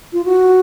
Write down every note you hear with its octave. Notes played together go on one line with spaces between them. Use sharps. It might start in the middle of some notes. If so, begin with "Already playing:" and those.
F4
F#4